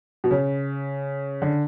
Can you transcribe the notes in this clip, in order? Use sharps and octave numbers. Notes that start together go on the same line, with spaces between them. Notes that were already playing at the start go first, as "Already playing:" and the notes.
B2
C#3
D3